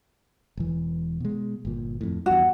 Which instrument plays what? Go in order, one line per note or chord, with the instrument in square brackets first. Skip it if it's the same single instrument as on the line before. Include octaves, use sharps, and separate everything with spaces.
[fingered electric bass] E1 E3
B2 G#3
G1 A#2
F2 A2
[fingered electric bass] E2 G2 [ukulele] F#4